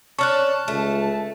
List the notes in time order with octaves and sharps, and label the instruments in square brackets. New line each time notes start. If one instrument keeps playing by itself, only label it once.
[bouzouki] C#4 D4 C#5 [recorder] A5 [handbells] C#6 F6 F#6
[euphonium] C#2 [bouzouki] A3